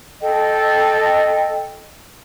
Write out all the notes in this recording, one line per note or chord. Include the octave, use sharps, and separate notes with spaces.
A4 D#5 G5